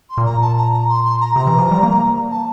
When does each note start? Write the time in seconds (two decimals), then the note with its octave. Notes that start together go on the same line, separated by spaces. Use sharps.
0.09 C6
0.18 A#2
0.25 A#5
0.41 A5
0.57 A#5
0.72 A#5
0.89 C6
1.04 C6
1.20 A#5
1.35 C3 A#5
1.47 E3
1.59 F3
1.71 G3
1.83 A#3
2.30 A5